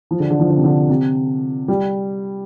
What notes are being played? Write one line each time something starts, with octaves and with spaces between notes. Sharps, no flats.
F3
D3
D3
F3
D3
C3
D3
C3
G3